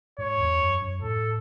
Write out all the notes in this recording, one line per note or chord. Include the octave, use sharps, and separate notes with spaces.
G#2 C#5
E2
F#2
F#2
A2 A4